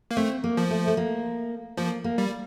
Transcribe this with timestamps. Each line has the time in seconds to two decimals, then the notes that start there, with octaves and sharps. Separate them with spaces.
0.11 A#3
0.17 A3 C4
0.44 A#3
0.57 F3
0.70 A3
0.87 A3
0.97 A#3
1.77 F3 A#3
2.04 A#3
2.18 G3